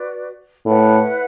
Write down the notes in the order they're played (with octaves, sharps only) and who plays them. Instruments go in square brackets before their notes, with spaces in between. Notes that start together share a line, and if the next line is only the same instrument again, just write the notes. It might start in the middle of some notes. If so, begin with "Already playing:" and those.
Already playing: [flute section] F#4 B4 D5
[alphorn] A2 [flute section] E4 B4 F#5